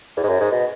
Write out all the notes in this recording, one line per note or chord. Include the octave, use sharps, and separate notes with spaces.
E2
G#2
F#2
G#2
B2